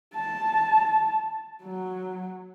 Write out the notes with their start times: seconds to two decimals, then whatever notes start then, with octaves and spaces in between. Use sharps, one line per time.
0.15 A5
1.63 F#3